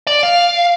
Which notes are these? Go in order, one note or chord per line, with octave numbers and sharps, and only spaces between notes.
D5
F5